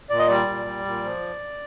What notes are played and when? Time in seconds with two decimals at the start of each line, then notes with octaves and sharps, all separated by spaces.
0.10 A#2 D5
0.19 D#5
0.28 G3 D5
0.48 A#2
0.66 G3
0.85 A#2
1.04 F3